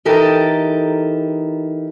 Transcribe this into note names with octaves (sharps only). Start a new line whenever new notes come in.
E3 D#4 G4 A4 A#4